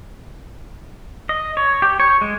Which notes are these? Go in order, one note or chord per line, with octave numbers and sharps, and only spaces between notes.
D#5
C#5
G4
C#5
G#3